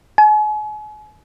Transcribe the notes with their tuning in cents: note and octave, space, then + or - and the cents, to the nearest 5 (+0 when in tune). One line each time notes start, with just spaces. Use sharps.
G#5 +40